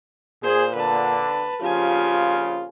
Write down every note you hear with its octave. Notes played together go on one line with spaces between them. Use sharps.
A#2 G#4 C5
D3 B4 A5
A#1 C#3 F3 F4 G4 G#5